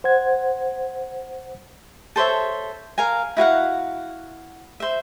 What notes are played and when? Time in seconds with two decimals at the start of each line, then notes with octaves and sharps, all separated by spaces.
0.04 C5 F#5 G#6
2.16 A4 C5 C#5 E5
2.98 A#4 F5 G#5
3.37 E4 F#4 F5 F#5
4.80 C5 E5